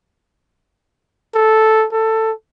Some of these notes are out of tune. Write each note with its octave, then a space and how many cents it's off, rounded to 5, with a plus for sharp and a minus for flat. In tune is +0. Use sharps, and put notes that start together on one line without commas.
A4 -5
A4 +15